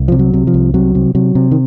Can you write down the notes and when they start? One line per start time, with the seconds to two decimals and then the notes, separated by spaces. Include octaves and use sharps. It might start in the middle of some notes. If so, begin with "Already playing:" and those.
Already playing: C2
0.08 C3 F3
0.19 F#3
0.33 C3
0.47 F3
0.54 C2
0.74 C3 F#3
0.95 C3
1.15 C3 F#3
1.35 C3
1.51 D#3